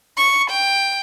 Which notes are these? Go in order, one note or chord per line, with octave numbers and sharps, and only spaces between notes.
C#6
G5